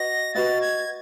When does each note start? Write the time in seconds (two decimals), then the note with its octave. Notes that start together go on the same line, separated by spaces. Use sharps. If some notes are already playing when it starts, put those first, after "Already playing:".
Already playing: F#4 B4 D#5 F#5 A#6
0.34 F#4 B4 D#5 F#5 A6
0.61 G#6